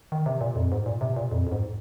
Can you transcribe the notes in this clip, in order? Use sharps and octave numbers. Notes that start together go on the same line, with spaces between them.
D#3
C3
A#2
F2
G#2
A#2
C3
A#2
F2
F2
G#2